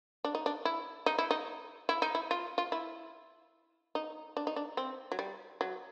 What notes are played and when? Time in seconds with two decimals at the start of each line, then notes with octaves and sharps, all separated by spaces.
0.25 D4
0.35 D#4
0.46 D4
0.65 E4
1.06 D#4
1.18 E4
1.31 D#4
1.89 E4
2.02 D#4
2.15 E4
2.31 F4
2.58 F4
2.72 E4
3.95 D#4
4.37 D4
4.47 D#4
4.56 D4
4.77 C4
5.12 F#3
5.19 G3
5.61 F#3